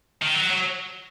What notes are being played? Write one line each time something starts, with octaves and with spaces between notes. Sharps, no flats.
D#3
F#3
F#3